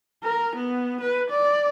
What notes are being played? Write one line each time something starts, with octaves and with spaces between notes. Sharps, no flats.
A#4
B3
B4
D5